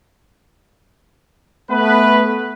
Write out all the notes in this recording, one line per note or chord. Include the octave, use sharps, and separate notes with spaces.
A3 B3 B4